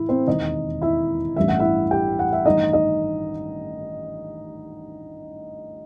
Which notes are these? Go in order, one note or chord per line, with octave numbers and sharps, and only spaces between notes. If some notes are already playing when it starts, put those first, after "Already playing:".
Already playing: A2 E3 E4 E5
C4 C5
E1 D#2 D#3 D#4 D#5
E4 E5
A1 G2 E3 E5
F#5
E4 E5
G4 G5
F#5
E5
A1 G2 D#3 D#4 D#5
D#4 D#5